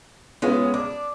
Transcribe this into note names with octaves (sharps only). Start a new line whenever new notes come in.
G#3 B3 C#4 F4
D4 D6